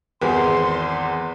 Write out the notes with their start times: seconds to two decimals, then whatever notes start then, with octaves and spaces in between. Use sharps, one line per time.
0.22 G#1 E2 G#4 B4 C6